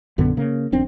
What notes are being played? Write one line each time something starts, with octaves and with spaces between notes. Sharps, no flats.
A#1 F#2 D3 B3
C#3 A#3
D#1 A#1 C4 D4